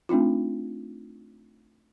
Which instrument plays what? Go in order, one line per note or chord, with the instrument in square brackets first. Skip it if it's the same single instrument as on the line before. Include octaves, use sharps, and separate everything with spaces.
[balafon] A3 C4 D4 D#4 F4